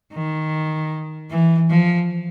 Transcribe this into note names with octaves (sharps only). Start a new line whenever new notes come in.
D#3
E3
F3